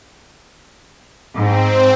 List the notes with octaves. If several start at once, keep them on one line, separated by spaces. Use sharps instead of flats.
G#2 C4